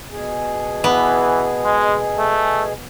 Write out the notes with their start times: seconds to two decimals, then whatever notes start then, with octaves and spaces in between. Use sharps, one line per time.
0.11 B2 G#4
0.84 E3 B3
1.65 G#3
2.19 A3